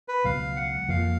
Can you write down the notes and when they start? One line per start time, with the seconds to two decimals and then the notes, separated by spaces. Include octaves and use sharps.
0.08 B4
0.24 C#2 B2 F#3 F5
0.56 F#5
0.88 F2 F3 A#3 F5